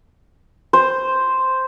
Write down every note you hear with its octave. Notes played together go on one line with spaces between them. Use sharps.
C5